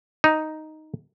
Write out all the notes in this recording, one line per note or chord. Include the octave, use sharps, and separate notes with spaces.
D#4